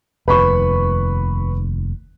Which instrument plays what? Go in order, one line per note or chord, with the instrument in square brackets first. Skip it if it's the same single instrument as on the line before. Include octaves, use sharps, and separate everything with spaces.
[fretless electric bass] F1 D#2 [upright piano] B4 B5 C#6